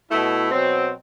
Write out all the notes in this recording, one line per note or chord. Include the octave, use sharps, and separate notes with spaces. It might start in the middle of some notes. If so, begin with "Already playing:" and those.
B2 A3 E4
B2 F#3 C4